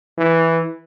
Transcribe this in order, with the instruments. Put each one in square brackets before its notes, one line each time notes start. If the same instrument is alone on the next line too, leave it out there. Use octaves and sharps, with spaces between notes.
[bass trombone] E3